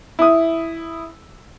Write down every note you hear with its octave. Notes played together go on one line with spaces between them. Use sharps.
E4 D#6